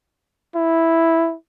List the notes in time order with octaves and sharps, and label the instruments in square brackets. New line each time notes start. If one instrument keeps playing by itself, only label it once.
[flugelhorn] E4